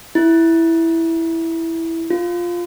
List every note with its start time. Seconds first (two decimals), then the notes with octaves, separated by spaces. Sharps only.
0.15 E4
2.10 F4